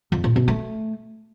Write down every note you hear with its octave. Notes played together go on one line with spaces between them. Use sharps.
F2
A#2
B2
A3